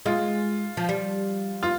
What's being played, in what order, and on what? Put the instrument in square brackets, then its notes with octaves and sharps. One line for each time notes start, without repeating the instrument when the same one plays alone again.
[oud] G#3 [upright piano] F4
[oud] F3
G3
[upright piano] F4